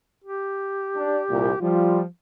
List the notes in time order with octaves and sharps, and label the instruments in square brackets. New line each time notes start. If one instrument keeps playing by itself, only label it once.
[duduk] G4
[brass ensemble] D4
C2 A#2
[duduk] F3 [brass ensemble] G3 F4